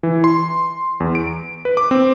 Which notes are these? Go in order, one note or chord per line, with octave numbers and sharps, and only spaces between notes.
E3
C6
E2
D7
B4
D6
C4